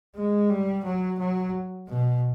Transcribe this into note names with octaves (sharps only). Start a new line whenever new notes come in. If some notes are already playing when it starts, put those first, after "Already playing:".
G#3
G3
F#3
F#3
B2